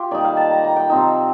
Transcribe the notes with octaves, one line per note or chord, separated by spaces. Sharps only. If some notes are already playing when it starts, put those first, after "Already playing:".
Already playing: F4 G4
D#3 G3 A#3 D#4 D5
F5
A5
A#5
A#5
G5
C3 F3 C4 D#4 A5